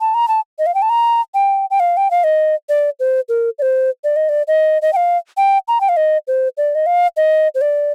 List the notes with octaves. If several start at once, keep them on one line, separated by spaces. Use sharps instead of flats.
A5
A#5
A5
D#5
F5
G5
A5
A#5
G5
G5
F5
G5
F5
D#5
D5
C5
A#4
D5
C5
D5
D#5
D5
D#5
D#5
G5
F5
G5
A#5
G5
F5
D#5
C5
D5
D#5
F5
D#5
C5
D5